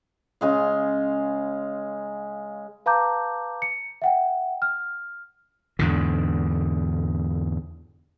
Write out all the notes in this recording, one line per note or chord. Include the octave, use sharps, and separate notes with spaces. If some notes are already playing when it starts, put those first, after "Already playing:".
C#3 G#3 F5
B4 F5 A5 A#5 D6 G6
C#7
E5 F#5 G5
F6
E2 G#2 D3